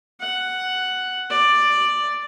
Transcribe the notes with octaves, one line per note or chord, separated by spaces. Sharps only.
F#5
D5